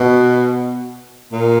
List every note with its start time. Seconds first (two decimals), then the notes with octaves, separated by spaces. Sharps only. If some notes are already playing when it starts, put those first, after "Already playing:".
Already playing: B2
1.32 A#2